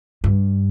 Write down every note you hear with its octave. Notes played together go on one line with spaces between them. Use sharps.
G2